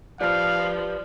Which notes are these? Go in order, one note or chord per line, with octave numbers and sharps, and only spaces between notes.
F3 G4 B4 D5 F5 A5 F6